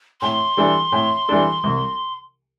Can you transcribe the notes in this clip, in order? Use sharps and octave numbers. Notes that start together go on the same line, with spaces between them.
A2 C6
E3 G3 D4 A4
A2
E3 G3 D4 A4
C2